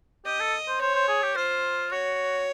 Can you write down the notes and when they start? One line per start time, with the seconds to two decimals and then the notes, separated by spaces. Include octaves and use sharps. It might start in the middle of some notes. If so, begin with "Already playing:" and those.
0.26 G4 D#5
0.40 A4
0.68 C5
0.81 C5 C#5
0.95 C5
1.08 G#4
1.23 G4
1.37 F4 C5
1.91 F#4 C#5